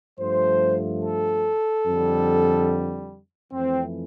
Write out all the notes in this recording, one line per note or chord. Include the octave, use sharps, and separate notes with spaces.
G2 F3 A3 C5
A4
F2 D3 G3
F2 E3 A3 C4